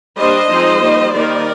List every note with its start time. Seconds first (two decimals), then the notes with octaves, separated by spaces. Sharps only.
0.18 G3 A#3 D4 C5 D#5
0.50 F3 G#3 C4 D#4
0.82 G3 A#3 D#4
1.14 D#3 G3 A#3 D#4 A#4 D5